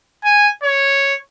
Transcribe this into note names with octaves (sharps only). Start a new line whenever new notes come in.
G#5
C#5